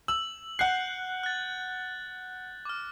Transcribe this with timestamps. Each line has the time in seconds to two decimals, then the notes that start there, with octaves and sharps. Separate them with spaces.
0.08 E6 F#7
0.59 F#5 F#6 G6 C7
1.24 F#6 A6
2.65 D6 F6